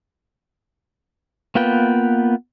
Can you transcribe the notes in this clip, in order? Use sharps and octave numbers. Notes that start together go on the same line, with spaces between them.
A#3 B3 F4 B4 G5